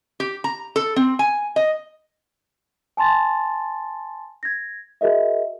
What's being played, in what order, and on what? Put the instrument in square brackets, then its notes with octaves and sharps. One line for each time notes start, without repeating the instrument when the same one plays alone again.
[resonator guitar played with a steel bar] G4
A#5
A4
C4
G#5
D#5
[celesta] G#5 A5 C6 A6
G#6 A#6
F#4 G#4 A#4 D#5 E5